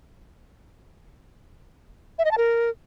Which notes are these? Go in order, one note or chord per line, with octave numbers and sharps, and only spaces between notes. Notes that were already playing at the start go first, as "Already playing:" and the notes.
E5
D#5
A5
A#4